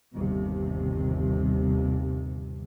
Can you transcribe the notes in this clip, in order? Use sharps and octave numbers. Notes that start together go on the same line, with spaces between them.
G1 D#2 C3